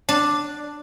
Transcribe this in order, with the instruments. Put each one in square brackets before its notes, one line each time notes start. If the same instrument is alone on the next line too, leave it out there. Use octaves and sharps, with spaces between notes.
[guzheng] D4